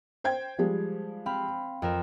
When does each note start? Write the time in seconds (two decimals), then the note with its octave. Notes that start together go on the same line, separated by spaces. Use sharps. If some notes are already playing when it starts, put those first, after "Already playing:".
0.24 C5 G5 G#6
0.58 F3 G3 G#3
1.26 C4 F5 B5
1.82 F2 A#4 E7